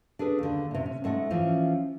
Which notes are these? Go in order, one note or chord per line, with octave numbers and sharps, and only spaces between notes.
D4 G#4 A4 B4
D#2 D3
A2 C3
C#4
G#2 A3 D#5 F#5
E3 F3 C#4